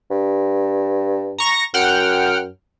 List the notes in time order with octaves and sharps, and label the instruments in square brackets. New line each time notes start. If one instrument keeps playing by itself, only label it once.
[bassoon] G2
[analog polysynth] A#5 C#6 A#6
[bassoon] F#2 [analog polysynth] F#5 G5 F6